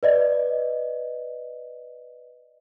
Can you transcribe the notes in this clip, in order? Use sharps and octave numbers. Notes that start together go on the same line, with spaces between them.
B4 D5 D#5